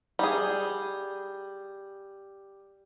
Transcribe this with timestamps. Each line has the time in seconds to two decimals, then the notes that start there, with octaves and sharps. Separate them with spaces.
0.19 G3 G#4